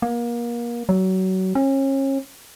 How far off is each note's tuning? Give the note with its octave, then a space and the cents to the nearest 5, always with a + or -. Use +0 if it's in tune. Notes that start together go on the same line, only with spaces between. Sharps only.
A#3 +30
F#3 +25
C#4 -35